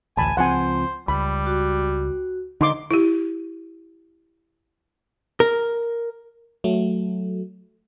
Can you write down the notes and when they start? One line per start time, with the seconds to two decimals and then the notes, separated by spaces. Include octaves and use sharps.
0.17 A1 D2 G#5 A5 B5
0.37 C#2 F3 C4 C5 F#5 G#5
1.08 C#2 G3 B5
1.46 F#4
2.61 D3 D#4 C6 D6
2.91 E4 G4
5.40 A#4
6.64 F#3 A3